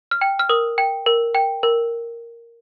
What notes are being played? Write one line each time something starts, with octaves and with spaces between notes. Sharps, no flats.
F6
G5
F6
A#4 D#6
G5
A#4
G5
A#4